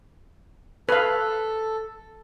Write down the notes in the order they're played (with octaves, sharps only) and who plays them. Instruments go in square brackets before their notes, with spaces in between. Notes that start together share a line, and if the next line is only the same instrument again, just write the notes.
[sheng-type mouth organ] A4 [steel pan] B4 F5